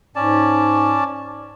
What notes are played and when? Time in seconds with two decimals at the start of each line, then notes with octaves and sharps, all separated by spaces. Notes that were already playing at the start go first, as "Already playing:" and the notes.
0.16 G#2 C#4 D5 A5